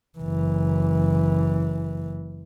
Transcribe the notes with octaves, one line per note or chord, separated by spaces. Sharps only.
F#1 E3